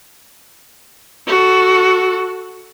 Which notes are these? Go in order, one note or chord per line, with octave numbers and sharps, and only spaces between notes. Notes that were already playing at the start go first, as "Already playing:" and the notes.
F#4 A4